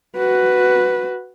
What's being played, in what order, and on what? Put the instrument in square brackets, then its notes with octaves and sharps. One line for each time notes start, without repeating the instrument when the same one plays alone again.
[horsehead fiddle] F#4 B4